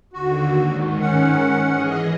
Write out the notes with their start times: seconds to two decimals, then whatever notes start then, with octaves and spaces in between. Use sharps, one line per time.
0.13 D#2 D3 F#4
0.60 G#2 D#3
1.01 C#4 F#5
1.65 E3 G#4 D#5